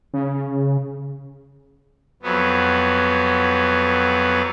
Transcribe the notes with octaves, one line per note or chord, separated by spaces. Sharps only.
C#3
F2 F#3 B3